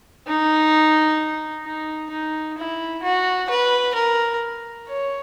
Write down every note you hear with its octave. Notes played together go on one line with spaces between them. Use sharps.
D#4
D#4
D#4
E4
F#4
B4
A#4
C#5